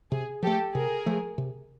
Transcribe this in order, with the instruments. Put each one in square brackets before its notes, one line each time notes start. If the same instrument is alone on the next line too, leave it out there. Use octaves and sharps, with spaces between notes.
[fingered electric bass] C3 [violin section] G#4
[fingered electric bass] F3 A3 [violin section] G4 A4
[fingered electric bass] C3 [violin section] G#4 A#4
[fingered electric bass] F3 A3
C3